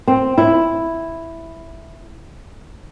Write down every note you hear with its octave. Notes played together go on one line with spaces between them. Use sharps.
C4
E4